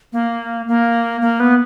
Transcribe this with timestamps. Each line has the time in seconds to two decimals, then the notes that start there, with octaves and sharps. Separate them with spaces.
0.13 A#3
0.68 A#3
1.21 A#3
1.40 B3